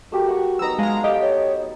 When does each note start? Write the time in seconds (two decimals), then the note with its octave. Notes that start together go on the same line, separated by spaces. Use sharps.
0.12 A3 F#4 G4 A#4
0.28 F#5 C#6
0.59 F#3 B3 D#4 A#5 E6
0.79 G#3 F5 A5 A#5
1.04 G4 A4 D#5
1.22 C#5